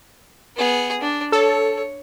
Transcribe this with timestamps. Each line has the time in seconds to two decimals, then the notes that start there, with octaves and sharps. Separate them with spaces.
0.57 B3 G#4
1.01 D4
1.32 A4 C#5